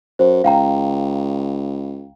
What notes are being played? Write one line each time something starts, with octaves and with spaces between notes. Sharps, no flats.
F#2 C5
C#2 F5 G5 A#5